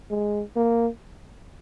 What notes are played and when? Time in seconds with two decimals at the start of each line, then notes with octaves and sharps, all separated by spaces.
0.10 G#3
0.56 A#3